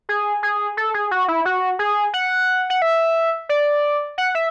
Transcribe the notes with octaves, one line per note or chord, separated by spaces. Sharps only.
G#4
G#4
A4
G#4
F#4
E4
F#4
G#4
F#5
F#5
E5
D5
F#5
E5